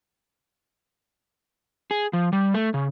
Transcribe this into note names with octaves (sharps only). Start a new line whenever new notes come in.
G#4
F3
G3
A3
C#3